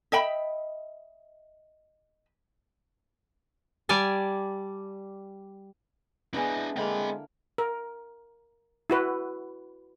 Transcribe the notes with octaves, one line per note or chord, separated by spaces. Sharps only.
D#5 E5 G5 B5
G3 D5 G#5 A5
G#3 B3 D4 E4 D#5
D3 G#3 A#3 C4 B5
A#4
E4 F#4 B4